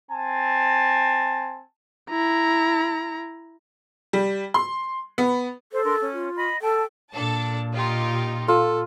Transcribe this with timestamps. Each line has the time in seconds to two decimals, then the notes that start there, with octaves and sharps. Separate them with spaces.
0.10 C4 G#5 A5
2.11 E4 A#5
4.13 G3
4.54 C6
5.18 B3
5.73 A4 C5
5.85 D4 A#4 C6
6.00 C#4
6.13 F4
6.36 D#5 B5 D#6
6.62 A4 G5 A5
7.14 A#2 D4 A4 A5
7.74 D#4 F4 G4
8.48 F4 A4